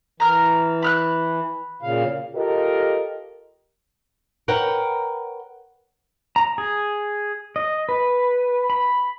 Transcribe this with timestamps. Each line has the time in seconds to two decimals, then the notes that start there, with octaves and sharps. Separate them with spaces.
0.20 E3 A#5 F6
0.82 B5 F6 F#6
1.83 A#2 C#3 F5
2.35 F4 G4 A4 A#4 D#5
4.48 A#4 B4 C#5 F#5 G5
6.36 A#5
6.58 G#4
7.56 D#5
7.89 B4
8.70 B5